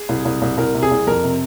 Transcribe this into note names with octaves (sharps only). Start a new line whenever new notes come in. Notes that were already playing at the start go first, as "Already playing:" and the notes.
Already playing: G#4
C2
C2
C2
C2 A#4
C3
G#4
C2
F2 A#4
C3